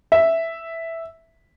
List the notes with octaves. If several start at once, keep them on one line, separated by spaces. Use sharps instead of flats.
E5